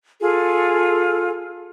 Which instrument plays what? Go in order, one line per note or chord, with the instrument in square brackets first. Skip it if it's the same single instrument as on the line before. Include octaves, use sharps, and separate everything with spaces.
[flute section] F4 G#4 A4